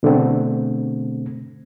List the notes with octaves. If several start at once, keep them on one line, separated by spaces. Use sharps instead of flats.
B2 D3 A3 C4